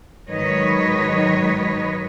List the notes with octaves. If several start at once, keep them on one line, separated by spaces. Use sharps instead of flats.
G#2 D#3 F#3 B4 C#5 D#5